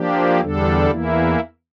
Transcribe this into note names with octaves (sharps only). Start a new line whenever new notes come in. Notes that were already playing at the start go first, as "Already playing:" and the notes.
Already playing: F3 A#3 D4 G4
E2 D3 G3 D4 A4
E2 E3 A#3 E4